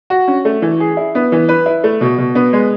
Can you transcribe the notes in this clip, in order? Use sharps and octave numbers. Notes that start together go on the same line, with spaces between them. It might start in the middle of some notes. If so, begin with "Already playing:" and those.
F#4
C#4
A3
E3
G#4
E4
B3
E3
B4
E4
A3
B2
B2
B3
G#3